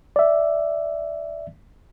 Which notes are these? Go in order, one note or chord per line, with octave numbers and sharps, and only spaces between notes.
D5 E5